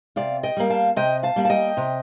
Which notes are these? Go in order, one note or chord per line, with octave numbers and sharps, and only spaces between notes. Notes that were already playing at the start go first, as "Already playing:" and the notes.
C3 D5 F5
D#5 G5
G3 A#3
F5 A5
C3 D#5 G5
F5 A5
G3 A#3
A5
D#5 G5
C3